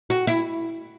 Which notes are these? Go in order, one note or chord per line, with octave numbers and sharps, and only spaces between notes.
F#4
E4